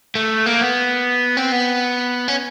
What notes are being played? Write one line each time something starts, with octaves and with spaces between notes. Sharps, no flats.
A3
A#3
B3
C4
B3
C#4